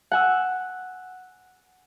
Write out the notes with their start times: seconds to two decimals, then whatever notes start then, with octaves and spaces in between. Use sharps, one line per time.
0.12 F#5 G#5 E6